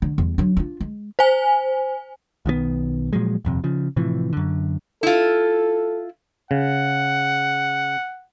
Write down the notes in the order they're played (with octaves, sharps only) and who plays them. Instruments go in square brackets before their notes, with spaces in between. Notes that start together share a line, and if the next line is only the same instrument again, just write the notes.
[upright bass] D3
E2 G3
F#3 D4
D4 F4
G#3
[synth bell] C5 G#5
[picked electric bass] B1 D#3 F3 B3
A#2 F3 F#3 G#3
D#1 F2 C3
C#3 F3
A2 C3 E3 F3
F#2 D3
[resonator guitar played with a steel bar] E4 F4 [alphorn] A4
[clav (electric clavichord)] C#3 [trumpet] F#5